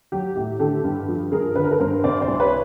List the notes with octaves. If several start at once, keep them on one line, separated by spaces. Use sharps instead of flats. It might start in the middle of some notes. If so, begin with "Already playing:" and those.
F#3 G4
A2 G4
D3 G4 A4
G2
F3
G2 G#4 A#4
D3 B4
A#4
A4 B4
G2 A#4 C5
C3 C5 D5
C5 D5
C2
B4 C#5